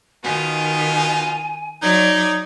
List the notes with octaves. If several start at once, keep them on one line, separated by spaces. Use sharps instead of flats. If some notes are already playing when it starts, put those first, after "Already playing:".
B2 D#3 D#4 F4 G#5
F#3 D#4 D5 G#6